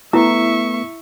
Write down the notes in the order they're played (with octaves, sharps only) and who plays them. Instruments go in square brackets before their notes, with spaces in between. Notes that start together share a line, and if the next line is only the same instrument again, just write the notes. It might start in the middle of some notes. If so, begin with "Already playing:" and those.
[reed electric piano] A3 B3 [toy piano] E4 A#5 D#6 [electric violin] E5 C#6